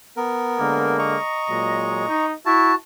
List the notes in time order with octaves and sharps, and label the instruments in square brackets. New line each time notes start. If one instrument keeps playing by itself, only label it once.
[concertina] B3 A#4
[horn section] D3 G#3 A#3
[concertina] D#5 A#5 C#6
[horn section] A#2 F#3 G#3
D#4
[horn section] E4 [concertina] F#4 A5